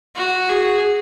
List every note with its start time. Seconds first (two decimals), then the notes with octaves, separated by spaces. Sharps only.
0.15 F#4
0.49 G#4